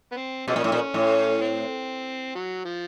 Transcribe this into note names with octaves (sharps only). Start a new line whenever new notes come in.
B3
C4
B2 F3 G#3 C#4
A#2
A2
A#2
A2
C4
F#3
F3